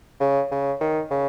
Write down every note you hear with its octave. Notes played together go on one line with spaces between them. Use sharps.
C#3
C#3
D#3
C#3